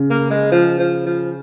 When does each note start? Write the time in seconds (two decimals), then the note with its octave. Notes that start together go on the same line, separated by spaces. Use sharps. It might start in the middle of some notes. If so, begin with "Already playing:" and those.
Already playing: C#3
0.10 A#3
0.31 G#3
0.52 F3
0.79 F3
1.06 F3